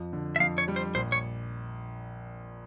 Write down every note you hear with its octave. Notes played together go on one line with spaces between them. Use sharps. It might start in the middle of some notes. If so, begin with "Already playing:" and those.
Already playing: F2 F3
D3
E5
F2 F5
C#5
G3
C5
A#1 C5
C#5